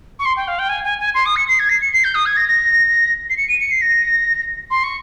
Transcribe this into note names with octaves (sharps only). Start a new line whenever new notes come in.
C#6
C6
G5
F5
G5
G#5
G#5
G#5
C6
D#6
C#7
C7
G#6
C7
C#7
C7
G6
D#6
G#6
A#6
A#6
C7
C#7
D#7
C#7
C7
A#6
C6
C#6